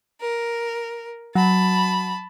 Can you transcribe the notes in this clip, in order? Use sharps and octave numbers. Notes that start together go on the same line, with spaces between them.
A#4
F#3 A5 B5